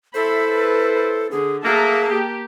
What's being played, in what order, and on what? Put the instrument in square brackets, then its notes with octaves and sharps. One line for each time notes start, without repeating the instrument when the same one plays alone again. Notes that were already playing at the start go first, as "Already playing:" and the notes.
[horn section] E4 C5 [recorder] A4 [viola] E5 B5
[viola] B4
[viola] D3 [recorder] G#4
[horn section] F#3 A3 A#3 [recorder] G#4 [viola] E5 A5
[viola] A#3 [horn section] G4